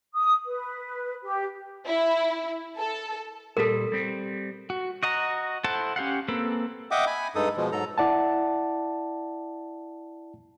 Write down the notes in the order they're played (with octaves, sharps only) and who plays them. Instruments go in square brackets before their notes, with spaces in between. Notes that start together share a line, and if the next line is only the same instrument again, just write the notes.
[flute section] D#6
B4
G4
[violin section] E4
A4
[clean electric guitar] A#2 G3 [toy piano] A4 A#4
[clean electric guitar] G3 C4
[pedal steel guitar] F#4
F#4 D#5 F#5 A#5
E4 A4 C5 F#5 A5
C#4 G4 F5 F#5
A#3 C4 A4 B4
[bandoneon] D#5 E5 F#5 G5 D6 D#6
G#5 B5
G2 G#3 D#4 A4 D#6
B2 F3 G#3
G#2 F#3 A4 A#5
[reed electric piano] E4 D5 F#5 A5